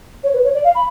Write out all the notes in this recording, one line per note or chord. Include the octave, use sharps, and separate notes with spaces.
C#5
B4
C#5
D5
F5
B5